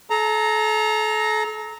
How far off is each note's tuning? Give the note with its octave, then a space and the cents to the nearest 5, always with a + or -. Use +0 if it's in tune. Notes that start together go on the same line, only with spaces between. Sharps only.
A4 -35 A#5 -5